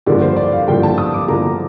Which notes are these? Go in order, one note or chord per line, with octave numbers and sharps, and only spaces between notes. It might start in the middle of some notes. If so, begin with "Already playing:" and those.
G2 D3 F3 A#3 D5
C5
D5
F5
G2 D3 F3 A#3 G5
A5
D#6
D6
G2 D3 F3 A#3 A#5